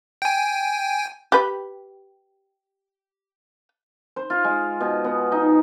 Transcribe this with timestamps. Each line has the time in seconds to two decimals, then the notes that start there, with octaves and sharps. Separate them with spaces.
0.22 G5 G#5
1.32 G4 B4
4.16 C5
4.30 F4
4.44 G#3
4.80 B2
5.04 B3
5.32 D#4